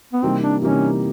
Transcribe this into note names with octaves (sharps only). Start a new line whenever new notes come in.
B3
C3 E3 G3 A#3 C4 D#4
D4
C3 E3 G3 A#3 C#4 D#4